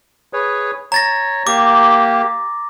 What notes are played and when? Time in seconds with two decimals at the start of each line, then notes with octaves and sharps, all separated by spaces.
0.33 G#4 B4 C#5
0.92 C#5 A#5 A6 A#6
1.47 A#3 G4 D6